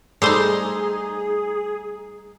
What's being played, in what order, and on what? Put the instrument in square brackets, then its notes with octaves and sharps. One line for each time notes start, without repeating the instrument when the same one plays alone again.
[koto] G3 A3 C5 [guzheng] D#4 C6 [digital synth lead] G#4